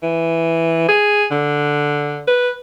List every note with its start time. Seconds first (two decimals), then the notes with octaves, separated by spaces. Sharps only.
0.02 E3
0.88 G#4
1.31 D3
2.27 B4